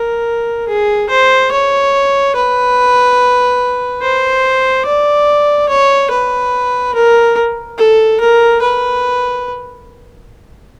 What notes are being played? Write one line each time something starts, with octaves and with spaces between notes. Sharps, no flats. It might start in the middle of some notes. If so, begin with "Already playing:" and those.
Already playing: A#4
G#4
C5
C#5
B4
C5
D5
C#5
B4
A#4
A4
A#4
B4